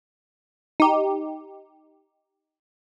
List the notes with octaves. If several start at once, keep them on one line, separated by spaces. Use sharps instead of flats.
D#4 G4